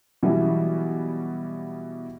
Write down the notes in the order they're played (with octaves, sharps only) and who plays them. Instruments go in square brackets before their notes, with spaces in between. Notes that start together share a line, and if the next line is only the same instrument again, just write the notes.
[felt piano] B2 E3 F#3 G3